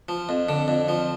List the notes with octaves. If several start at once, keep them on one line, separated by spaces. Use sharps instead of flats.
F3
F2
D3
F2
F3